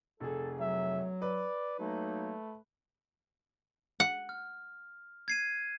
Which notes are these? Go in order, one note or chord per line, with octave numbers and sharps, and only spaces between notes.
F1 G#4 A4
F#3 E5
B4 D5
F#3 A3 A#3 D#4
F#5
F6
G#6 C7 D#7